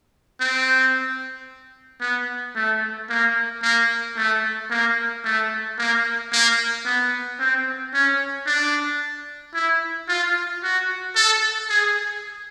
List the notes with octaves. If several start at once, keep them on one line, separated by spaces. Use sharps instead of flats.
C4
B3
A3
A#3
A#3
A3
A#3
A3
A#3
A#3
B3
C4
C#4
D4
E4
F4
F#4
A4
G#4